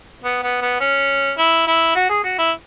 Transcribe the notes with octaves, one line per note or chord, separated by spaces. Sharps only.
B3
B3
B3
C#4
E4
E4
F#4
G#4
F#4
E4